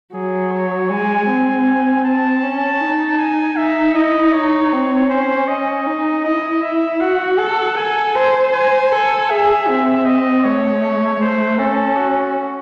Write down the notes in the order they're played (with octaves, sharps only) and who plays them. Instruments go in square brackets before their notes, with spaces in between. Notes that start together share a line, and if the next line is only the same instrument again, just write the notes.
[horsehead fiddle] F#3 [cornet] G#4
[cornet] C#5
[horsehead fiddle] G#3 [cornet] G#5
[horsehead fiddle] C4
[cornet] A5
[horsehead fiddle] C#4
D#4
[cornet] G#5
[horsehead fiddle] D#4 [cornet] E5
[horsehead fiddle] E4 [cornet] D#5
[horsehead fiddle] D#4 [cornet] C#5
[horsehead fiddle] C4
[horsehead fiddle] C#4 [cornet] C5
[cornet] D#5
[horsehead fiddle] D#4
[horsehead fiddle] E4 [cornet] D#5
[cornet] E5
[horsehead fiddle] F#4 [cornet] F#5
[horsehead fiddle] A4
[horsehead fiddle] A4 [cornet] G#5
[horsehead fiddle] C5
[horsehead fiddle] C5 [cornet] G#5
[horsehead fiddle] A4
[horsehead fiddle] G#4 [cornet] E5
[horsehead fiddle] C4
[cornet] D#5
[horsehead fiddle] A3 [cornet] C#5
[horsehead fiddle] A3 [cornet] C5
[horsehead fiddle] C#4 [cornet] A4
[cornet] F#4